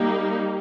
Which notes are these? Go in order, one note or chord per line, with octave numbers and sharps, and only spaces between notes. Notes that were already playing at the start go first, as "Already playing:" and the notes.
Already playing: G3 A#3 D#4 G4